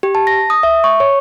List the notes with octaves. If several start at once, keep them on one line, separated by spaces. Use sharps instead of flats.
G4
A5
A#6
D#6
E5
C#6
C#5